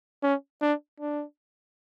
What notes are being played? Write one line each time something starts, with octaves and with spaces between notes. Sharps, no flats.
C#4
D4
D4